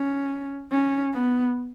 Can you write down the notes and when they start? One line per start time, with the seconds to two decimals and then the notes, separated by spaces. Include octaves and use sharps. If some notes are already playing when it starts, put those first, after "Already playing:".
Already playing: C#4
0.71 C#4
1.14 B3